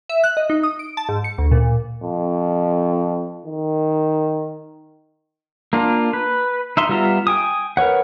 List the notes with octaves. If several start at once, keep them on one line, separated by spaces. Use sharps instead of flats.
E5
F#6
D#5
D#4
D#6
D7
A5
G#2
C#7
D2
A#2
F2
D#3
A#3 D4 F4
B4
D#4 E5 C6
G3 B3 F4 E5 A#5
G5 G#5 D#6
A#4 B4 C#5 F#5